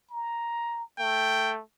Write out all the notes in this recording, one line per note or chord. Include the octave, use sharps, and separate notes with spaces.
A#5
A3 G5